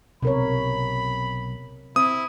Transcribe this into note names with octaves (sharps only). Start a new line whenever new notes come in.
B1 C3 A#4 C#5 B5
C4 E4 D#6